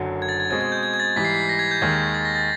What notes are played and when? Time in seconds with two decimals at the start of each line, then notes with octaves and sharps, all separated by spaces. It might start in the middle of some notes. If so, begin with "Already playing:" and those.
Already playing: F#1 F#2 D3 F#3
0.22 G#6
0.29 A6
0.40 G#6
0.50 B2 G#3 C4 G#6
0.61 G#6
0.72 G6
0.83 G#6
0.94 G#6
1.00 A6
1.16 G#2 E3 G3 B6
1.25 C7
1.34 B6
1.49 A#6
1.59 G#6
1.71 G6
1.81 D#2 D#3 G#3 G#6
2.14 A6
2.25 A#6
2.36 A6